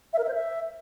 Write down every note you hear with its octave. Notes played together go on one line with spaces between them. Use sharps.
E5
A#4
E5
C5
E5